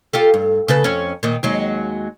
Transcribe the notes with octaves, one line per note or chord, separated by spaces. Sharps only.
F4 G4 A4
G2
C#3 A4 B4
F2 C#4
A#2 D#3
D#2 F#3 G#3